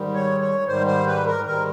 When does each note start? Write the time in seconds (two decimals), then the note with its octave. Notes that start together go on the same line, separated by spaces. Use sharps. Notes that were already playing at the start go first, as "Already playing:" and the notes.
Already playing: G#2 D#3 G3
0.14 C#5
0.40 C#5
0.67 G#2 D#3 G3 C5
0.87 C5
1.07 B4
1.26 A#4
1.46 G#2 D#3 G3 A#4